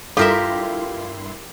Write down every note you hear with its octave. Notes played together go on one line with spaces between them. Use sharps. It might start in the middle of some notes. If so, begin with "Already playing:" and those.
G2 E4 F4 G4 A4 A#4 E5 C6